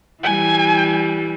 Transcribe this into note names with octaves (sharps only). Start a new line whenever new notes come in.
E3 G3 G#5